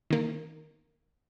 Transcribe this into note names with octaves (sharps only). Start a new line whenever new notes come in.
D#3 A#3